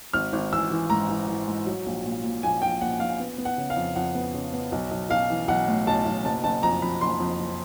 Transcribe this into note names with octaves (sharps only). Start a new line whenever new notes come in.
G#1 F6
G#1
E3 E6
E3
G#2 A#5
E3
E3
G#2
F#3
A#1
A#2
A#2
A#1 G#5
A#1 G5
A#1 F#5
A#1 F5
B3
B3
F#5
C#3
F5
F2
F2 F#5
B3
C#3
B3
B1
B1
B1 F5
E3
B1 F#5
A2
B1 A5
B1
F#1 A5
F#1 A5
F2 A#5
F2 B5
F#1 C6
F2
F#1